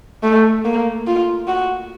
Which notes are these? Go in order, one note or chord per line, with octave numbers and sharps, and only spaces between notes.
A3
A#3
F4
F#4